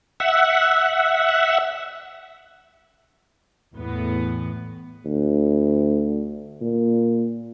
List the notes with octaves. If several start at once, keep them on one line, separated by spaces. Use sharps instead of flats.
E5 F#5
E2 A2 B3
D2
A#2